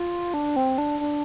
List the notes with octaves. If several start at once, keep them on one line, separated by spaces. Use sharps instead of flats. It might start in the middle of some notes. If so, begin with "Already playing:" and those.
Already playing: F4
D4
C4
D4
D4